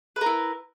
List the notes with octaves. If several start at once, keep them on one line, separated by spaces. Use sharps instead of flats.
E4 A#4 B4